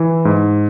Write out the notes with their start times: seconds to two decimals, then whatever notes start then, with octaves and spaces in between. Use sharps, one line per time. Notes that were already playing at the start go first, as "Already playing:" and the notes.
Already playing: E3
0.25 G#2